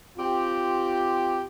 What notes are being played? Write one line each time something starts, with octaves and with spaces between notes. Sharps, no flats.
C4 F4 G4